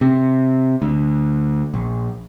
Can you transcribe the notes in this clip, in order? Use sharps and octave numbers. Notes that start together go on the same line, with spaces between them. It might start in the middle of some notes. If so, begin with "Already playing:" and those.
C3
D2
A#1